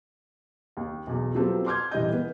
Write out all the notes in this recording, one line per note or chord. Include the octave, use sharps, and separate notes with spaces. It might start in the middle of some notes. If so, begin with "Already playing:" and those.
D#2
B1 E2
F3 F#3 B3 C4 G4 A4
C6 D6 F6 G6 G#6
D#1 E3 G3 D#5 G6
B3